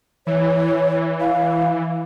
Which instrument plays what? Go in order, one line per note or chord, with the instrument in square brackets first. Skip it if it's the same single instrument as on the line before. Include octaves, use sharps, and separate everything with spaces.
[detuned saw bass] E3 [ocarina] C#5
[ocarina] F5